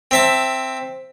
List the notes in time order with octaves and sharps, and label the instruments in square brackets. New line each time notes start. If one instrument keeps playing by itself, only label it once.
[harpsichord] C4 E5 A5